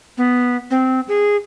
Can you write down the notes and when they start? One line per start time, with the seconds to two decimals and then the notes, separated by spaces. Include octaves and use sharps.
0.18 B3
0.71 C4
1.08 G#4